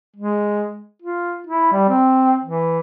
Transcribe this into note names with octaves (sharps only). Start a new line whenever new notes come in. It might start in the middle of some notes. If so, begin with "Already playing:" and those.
G#3
F4
E4
G3
C4
E3